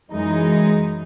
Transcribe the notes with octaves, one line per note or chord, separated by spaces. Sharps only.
F#2 E3 G#3 D#4